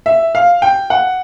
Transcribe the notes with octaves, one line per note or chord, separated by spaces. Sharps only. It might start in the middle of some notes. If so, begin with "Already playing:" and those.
E5
F5
G5
F#5